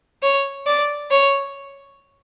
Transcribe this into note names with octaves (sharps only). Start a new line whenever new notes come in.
C#5
D5
C#5